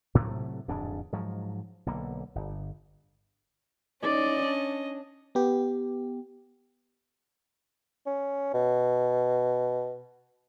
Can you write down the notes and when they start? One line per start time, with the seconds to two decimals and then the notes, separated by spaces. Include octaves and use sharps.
0.15 A2 C3 F#3 A3
0.68 D1 F2 G#2 D4
1.12 G#2 F3 F#3
1.86 B1 D3 A#3
2.35 G1
4.03 C#4 D#4 D5 D#5
4.45 D4
5.35 B3 G4
8.06 C#4
8.54 B2